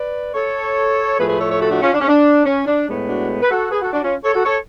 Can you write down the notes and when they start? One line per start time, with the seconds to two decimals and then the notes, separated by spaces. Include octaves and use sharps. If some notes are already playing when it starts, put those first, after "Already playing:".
Already playing: B4 D5
0.34 A4 C#5
1.19 A2 F3 A3 G#4 B4
1.29 G#4 B4
1.40 A4 C#5
1.50 A4 C#5
1.61 F#4 A4
1.71 D4 F#4
1.82 C#4 F4
1.93 D4
2.00 C#4
2.08 D4
2.45 C#4
2.66 D4
2.88 A2 G#3 B3
3.09 D4 F#4
3.42 B4
3.50 F#4 A4
3.71 G#4 B4
3.81 F#4 A4
3.93 D4 F#4
4.03 C#4 F4
4.24 A4 C#5
4.34 F#4 A4
4.45 A4 C#5